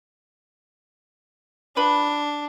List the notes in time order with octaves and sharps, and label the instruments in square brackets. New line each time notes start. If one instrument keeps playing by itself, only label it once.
[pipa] F3 B4 B5 [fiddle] D4